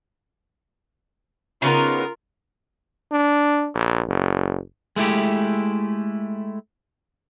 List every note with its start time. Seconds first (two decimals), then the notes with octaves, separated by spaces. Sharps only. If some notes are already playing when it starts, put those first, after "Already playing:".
1.62 C#3 B3 D#4 F4 A#4
3.12 D4
3.74 A#1
4.08 F#1
4.96 G#3 A3 E4 G4